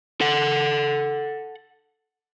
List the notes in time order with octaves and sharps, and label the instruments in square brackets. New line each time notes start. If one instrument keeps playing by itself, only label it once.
[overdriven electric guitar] A4 F#5